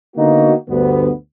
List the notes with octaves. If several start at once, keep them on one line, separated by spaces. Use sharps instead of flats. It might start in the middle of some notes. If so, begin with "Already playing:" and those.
D3 A#3 B3 D#4 F#4
D2 G2 D3 B3